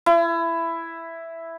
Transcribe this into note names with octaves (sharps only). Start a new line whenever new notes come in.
E4